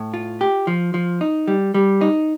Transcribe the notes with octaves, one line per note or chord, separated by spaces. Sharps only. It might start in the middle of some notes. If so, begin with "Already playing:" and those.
Already playing: A2
F4
G4
F3
F3
D#4
G3
G3
D#4